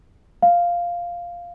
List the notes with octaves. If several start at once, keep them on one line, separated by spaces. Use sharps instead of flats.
F5